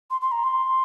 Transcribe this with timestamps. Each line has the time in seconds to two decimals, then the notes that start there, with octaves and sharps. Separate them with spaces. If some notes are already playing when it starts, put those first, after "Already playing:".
0.10 C6
0.21 C6
0.32 A#5
0.44 C6